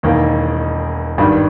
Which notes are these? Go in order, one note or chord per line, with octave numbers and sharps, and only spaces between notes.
E1 E2 D#3 A#3
G#1 G2 D#3 G3